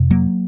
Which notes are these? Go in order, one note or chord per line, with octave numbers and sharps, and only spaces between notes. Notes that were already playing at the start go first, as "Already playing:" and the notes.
Already playing: F2 C3
F#3 A#3